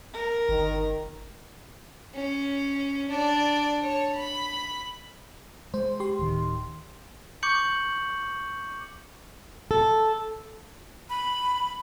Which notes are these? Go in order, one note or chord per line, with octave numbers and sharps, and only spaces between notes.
A#4
G1 D#3
C#4
D4 D5
C#5 A5
B5
G#3 C5
G4 C6
D1 D#3
C#6 D6 G6 C#7 F#7
A4
B5